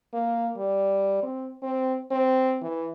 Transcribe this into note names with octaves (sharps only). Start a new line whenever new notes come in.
A#3
G3
C4
C4
C4
E3